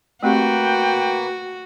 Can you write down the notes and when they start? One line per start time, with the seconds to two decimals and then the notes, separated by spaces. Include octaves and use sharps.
0.23 A3 A#3 C4 F#4 G4 B4 G5